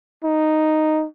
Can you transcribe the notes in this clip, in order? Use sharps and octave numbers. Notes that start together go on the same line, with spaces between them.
D#4